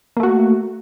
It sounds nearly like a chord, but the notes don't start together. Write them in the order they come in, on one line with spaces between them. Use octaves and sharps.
A#3 A3 F#4